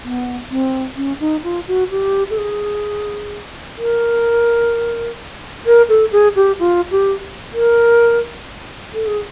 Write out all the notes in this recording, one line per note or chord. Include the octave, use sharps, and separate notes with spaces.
B3
C4
C#4
D#4
F4
F#4
G4
A4
G#4
A#4
A#4
A4
G#4
G4
F4
G4
A#4
A4
G#4